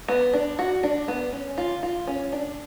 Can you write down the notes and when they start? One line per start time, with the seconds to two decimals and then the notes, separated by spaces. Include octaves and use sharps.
0.08 B3
0.33 D4
0.59 F#4
0.83 D4
1.08 B3
1.32 C#4
1.58 F4
1.83 F4
2.07 C#4
2.32 D4